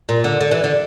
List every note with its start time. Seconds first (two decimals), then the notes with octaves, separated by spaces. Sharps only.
0.09 A#2
0.24 D3
0.41 D3
0.51 E3
0.64 D3